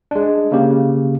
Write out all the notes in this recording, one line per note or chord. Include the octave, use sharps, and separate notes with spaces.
G#3 D4
C#3 A#3 G4